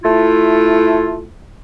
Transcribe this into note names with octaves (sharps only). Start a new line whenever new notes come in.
A3 E4 F4